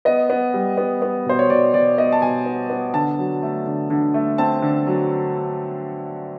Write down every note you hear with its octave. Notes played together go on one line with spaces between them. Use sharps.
B3 D#5
B3
G3
B3
B3
B2 C5
C#5
B2 D5
B2 D5
B3 D#5
A5
B2 G#5
B3
B3
D3 A5
F#3
A3
D3
D3
A3
C4 A5
D3
F#3